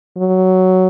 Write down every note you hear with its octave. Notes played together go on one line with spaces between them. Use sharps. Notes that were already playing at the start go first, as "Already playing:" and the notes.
F#3